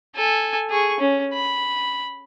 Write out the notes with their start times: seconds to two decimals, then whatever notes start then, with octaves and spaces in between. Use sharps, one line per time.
0.16 A4 G#5
0.69 G#4 C#6
1.00 C#4
1.34 B5